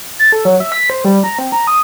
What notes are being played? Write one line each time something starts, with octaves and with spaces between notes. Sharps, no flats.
A6
A4
F#3
E5
B6
C5
G3
A#5
C4
A#5
D#6